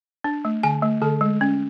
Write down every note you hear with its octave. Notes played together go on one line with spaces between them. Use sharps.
D4
A3
D3 G#5
A3
D3 A4
G#3
C#4